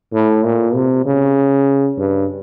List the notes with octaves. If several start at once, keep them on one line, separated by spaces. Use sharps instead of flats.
A2
A#2
C3
C#3
G2